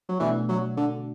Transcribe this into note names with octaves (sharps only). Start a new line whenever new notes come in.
F#3
B2 E3 A3 D4 F#4
F#3
D3